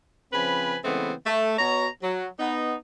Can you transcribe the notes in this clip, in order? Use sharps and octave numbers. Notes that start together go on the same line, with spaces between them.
C#3 F3 C4 B4 G#5 B5
C#3 E3 G#3 A3 B3 C4
A3
B2 C#5 A#5
F#3
B3 D#4